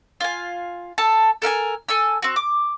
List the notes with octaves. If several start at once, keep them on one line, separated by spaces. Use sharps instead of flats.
F4 G#5
A4 A5
A4 A#4 F5 G#5
A4 G#5 E6
C4 F#4
D6